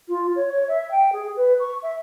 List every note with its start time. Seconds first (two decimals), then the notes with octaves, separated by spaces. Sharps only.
0.08 F4
0.36 C#5
0.52 C#5
0.68 E5
0.91 G5
1.13 G#4
1.36 B4
1.60 C#6
1.82 E5